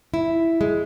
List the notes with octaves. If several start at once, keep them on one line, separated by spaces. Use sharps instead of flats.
E4
G#3